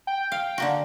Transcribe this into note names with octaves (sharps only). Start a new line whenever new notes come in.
G5
F5
D3 A#3 F#4